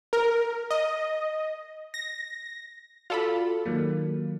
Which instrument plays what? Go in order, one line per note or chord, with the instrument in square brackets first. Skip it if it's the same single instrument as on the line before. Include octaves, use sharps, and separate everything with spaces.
[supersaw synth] A#4
D#5
A#6
[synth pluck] F4 A4 B5 [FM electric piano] F#4 D5
[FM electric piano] D#3 F#3 A#3